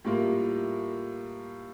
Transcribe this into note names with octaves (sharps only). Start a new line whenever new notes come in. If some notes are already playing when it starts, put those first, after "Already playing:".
A2 G3 A#3 F4 A#4